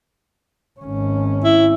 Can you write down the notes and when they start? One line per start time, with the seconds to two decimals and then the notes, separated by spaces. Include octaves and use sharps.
0.80 G#1 C#4
1.44 E4